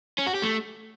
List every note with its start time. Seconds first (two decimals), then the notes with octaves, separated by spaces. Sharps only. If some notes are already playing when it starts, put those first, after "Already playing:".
0.19 C#4
0.27 F#4
0.35 G4
0.43 A3